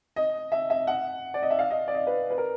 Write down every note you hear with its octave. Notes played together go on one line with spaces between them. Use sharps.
D#5
E5
E5
F#5
D5
D#5
E5
F5
D#5
D5
D#5
B4
B4
A#4